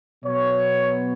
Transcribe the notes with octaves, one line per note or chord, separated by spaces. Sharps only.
B2 F#3 B3 C#5